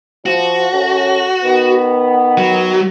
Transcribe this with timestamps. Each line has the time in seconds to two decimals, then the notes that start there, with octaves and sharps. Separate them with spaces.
0.26 F3 F#4
0.73 F#2 C#4 A4
1.42 D#3 B3
2.38 F#3